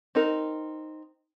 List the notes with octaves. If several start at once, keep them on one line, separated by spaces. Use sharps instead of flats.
C4 D#4 A#4